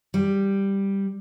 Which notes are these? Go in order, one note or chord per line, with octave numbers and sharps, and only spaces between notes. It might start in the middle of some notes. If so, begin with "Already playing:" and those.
G3